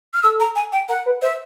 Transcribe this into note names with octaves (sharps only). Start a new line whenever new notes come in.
F6
A4 E6
A#5
G#5
G5
A#4 F#5
B4
C5 E5